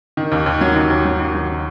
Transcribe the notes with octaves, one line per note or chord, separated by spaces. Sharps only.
D#3
D#2
D#2
F#3
D#2
D#2
F#3
D#2
F#3